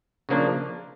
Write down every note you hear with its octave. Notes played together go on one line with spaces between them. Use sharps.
C#3 F3 A#3 D4